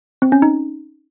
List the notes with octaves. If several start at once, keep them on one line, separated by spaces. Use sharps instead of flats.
C4
C#4
D#4